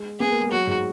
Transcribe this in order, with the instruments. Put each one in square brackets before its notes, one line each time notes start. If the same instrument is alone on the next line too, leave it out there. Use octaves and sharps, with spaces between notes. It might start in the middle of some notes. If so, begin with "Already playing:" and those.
Already playing: [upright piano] G#3
[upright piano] B3 [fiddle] G#4
[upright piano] A#3
G#3
[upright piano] F#3 [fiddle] F#4
[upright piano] G#2